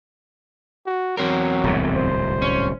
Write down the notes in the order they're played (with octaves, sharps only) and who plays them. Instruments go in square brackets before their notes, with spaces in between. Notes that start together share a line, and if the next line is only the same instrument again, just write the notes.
[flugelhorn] F#4
[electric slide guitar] E2 C4 A#4 [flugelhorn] F#3
[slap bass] D1 C2 G#2
[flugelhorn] C5
[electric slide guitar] C#4